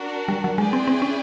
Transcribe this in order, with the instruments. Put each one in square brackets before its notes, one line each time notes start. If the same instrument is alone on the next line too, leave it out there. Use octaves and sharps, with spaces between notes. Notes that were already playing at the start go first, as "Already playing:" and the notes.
Already playing: [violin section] D4 F#4 A#4
[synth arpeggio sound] G3
F#3
[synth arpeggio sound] G#3 [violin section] E4 G#4 B4 D5 G5
[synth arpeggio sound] C4
C4
C#4